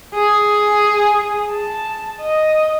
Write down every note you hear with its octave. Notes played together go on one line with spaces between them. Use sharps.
G#4
A5
D#5